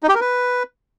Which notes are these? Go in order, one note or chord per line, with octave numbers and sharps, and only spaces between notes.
D#4
G4
A#4
B4